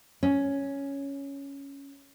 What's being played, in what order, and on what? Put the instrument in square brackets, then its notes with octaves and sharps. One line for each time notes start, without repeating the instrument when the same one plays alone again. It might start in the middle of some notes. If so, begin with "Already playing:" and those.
[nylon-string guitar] C#4